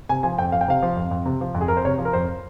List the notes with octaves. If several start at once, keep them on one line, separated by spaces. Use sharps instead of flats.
C3 G#5
F3 G#5
F2 G5
F2 F5
G5
C3 F5
F3
F2
F2
C3
F3
F2
G#4
F2 A#4
C5
C3 C#5
F3
A#4
F2 C5